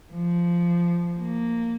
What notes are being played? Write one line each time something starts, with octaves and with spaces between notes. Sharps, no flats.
F3
A#3